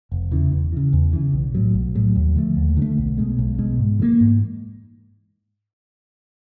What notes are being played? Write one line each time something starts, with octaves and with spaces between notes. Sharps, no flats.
F1
E2 C#3 E3
E2
C#3 E3
E2
C#3 E3
B1
A2 F#3
B1
A2 F#3
D#2
D3 F3 A3
D#2
D3 F3
A3
B1
B2 G#3
B1
B2 G#3
G#2
E3 G3 A#3
G#2